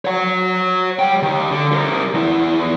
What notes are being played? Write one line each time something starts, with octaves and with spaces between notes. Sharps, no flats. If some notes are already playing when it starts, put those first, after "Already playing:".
C#5 F#5
G3 G5
D#3 G4
D3
G3 A#4
E2 E4